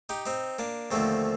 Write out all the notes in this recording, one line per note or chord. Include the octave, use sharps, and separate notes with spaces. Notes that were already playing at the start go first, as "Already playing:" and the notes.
D#4 G4
C4 D#4
A#3 D4
D#2 D3 F3 A3 C4